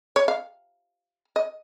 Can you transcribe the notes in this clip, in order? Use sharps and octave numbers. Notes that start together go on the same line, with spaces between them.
C#5
F5
D#5